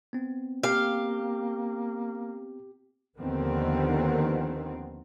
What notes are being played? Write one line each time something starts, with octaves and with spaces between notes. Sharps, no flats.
B3 C4
A#3 G4 F5
D#2 D3 D#3 F3 B3 C4